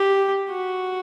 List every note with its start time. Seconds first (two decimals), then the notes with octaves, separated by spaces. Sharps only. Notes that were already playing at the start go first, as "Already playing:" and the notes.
Already playing: G4
0.50 F#4